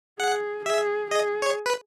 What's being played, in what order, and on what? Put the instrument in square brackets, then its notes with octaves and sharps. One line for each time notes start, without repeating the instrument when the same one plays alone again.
[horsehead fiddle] G#4 [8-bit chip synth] F#5
[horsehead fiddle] G#4 [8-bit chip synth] E5
[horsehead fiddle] G#4 [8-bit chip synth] D#5
[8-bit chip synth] C#5
B4